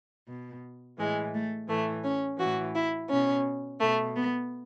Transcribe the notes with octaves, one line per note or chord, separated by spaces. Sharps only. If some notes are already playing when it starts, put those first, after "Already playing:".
B2
A2 E3 G#3
A3
A2 E3 A3
C#4
A2 E3 F#4
E4
B2 C#4
B2 A3
B3